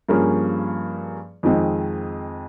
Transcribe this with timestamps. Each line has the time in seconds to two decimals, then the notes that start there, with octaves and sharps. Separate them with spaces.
0.09 G2 F3 A#3 C#4 G#4
1.43 F2 D#3 G#3 C4